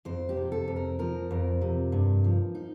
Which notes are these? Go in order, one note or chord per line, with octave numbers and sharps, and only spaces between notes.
F2 C5
G4
C3
A4
F2
A#4
F3 A#4
F2
C3
G2
F3
D#4